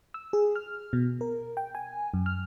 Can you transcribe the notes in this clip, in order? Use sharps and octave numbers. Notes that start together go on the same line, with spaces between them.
E6
G#4
F6
B2
A#4
G5
G#5
F#2
F6